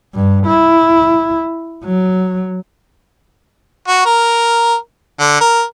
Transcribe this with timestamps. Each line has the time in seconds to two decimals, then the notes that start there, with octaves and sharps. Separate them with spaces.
0.14 G2
0.47 E4
1.85 F#3
3.88 F#4
4.06 A#4
5.20 D3
5.41 A#4